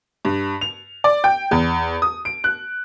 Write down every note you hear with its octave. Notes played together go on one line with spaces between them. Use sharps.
G2
F7
D5
G5
E2
D#6
D7
F#6